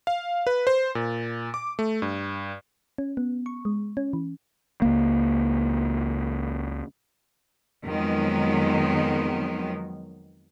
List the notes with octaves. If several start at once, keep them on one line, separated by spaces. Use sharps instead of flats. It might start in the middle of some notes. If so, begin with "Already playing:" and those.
F5
B4
C5
A#2
D6
A3
G2
C#4
B3
C#6
G#3
C#4
E3
C#2 A#3
F2 D#3 F#3 G#3 B3